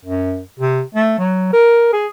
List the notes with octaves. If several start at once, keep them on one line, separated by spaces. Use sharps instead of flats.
F#2
C3
A3
F#3
A#4
G#4